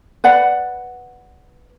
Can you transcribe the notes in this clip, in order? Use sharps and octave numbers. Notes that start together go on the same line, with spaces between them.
B4 D5 F#5 B5